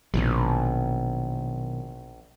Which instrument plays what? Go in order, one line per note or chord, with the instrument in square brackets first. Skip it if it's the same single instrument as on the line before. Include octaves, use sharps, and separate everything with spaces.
[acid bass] A#1 [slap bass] B2 D#3 F#3